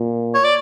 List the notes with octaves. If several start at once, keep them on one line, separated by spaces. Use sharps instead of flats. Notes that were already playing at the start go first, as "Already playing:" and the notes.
Already playing: A#2
C#5
D5